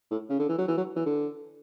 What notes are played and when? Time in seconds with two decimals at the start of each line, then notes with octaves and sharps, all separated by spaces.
0.10 A2
0.29 C#3
0.39 D3
0.49 E3
0.58 F#3
0.68 E3
0.77 F#3
0.96 E3
1.05 D3